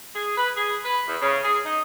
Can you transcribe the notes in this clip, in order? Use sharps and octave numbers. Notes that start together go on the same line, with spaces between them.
G#4
B4
G#4
B4
E2
C#3
G#4
D#4